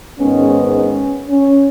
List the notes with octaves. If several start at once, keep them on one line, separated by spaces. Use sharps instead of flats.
G#2 D#3 G#3 B3 C#4
C#4
C#4